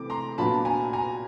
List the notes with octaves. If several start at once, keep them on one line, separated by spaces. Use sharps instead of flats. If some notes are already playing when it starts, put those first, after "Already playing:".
Already playing: C3 E3 A3 D6
A#5 C6
A#2 F#3 B3 D4 F4 A5 B5
G#5 A#5
G#5 A#5